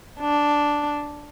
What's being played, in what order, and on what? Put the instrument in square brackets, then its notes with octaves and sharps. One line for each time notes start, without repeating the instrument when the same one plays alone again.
[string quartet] D4